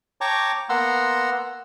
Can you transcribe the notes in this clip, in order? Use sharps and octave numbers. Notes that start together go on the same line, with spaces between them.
C#5 G5 A5 A#5 C#6 D6
A#3 B3 F#5 A#5 C6 E6